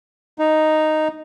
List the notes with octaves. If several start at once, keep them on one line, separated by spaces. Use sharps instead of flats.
D#4